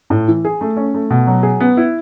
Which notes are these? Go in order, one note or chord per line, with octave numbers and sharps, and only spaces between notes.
A2
E3
G#4
A3
C#4
A3
B2
F#3
G#4
B3
E4